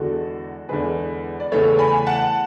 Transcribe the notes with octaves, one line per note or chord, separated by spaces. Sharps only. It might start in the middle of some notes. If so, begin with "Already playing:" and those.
Already playing: E2 D3 G#3 F#4 A4
E2 D3 G#3 G#4 B4
D5
E2 C#3 E3 A3 A4 C#5
G#5 B5
F#5 A5